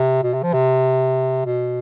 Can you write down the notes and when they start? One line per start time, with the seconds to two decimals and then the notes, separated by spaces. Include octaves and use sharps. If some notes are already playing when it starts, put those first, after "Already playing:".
Already playing: C3
0.23 B2
0.34 C3
0.43 F3
0.54 C3
1.46 B2